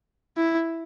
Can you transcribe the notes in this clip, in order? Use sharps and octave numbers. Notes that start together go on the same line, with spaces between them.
E4